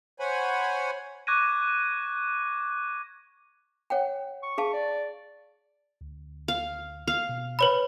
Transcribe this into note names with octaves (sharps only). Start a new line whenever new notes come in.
C5 C#5 F#5 G#5 B5
C#6 D6 F#6 G#6 A#6 D#7
C#5 F#5 G5
C#6
G#4 F5 A5
D5
D2
F5
F5
B2
B4 C#5 B5